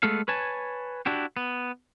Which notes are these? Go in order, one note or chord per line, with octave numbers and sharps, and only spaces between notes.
G#3 A3 B3 A4 F5
B4 C#5 G#5 A5
D4 E4 F#4 G4
B3